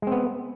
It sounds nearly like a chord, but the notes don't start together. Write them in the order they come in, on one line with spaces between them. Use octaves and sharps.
G#3 C4 B3